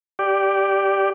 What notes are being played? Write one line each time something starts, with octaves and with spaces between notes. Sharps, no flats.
G4 D5